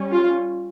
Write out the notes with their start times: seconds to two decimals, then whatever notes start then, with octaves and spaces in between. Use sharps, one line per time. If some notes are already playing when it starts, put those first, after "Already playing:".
Already playing: G3 C#4
0.12 F4